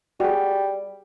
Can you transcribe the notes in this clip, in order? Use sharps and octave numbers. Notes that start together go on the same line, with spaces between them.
G3 F#4 G#4